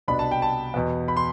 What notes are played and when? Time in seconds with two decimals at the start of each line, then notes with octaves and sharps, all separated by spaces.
0.08 C2 B2 B3 D4 B5
0.19 A5
0.31 G5
0.42 A5
0.74 E2 B2 B3
1.08 B5
1.17 C6